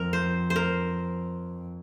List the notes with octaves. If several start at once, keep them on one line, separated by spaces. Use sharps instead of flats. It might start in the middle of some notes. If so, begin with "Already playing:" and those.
Already playing: F2 A#4
C5
C5
A#4